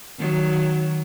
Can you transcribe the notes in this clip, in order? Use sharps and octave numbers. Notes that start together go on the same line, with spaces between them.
D#3 F#3